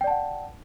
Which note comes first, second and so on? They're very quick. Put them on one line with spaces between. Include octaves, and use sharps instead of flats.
G5 D5 A5 F#5